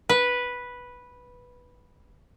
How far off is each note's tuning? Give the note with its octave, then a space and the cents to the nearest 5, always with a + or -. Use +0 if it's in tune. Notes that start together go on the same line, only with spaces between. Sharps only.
B4 -5